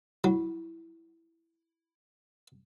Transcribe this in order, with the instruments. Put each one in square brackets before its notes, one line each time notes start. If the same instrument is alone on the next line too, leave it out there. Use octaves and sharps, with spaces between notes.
[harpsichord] F#3 [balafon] E4